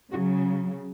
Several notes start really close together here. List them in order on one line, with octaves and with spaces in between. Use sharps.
C#3 F#4 F#3